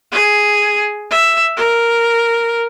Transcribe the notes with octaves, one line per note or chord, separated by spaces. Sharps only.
G#4
E5
A#4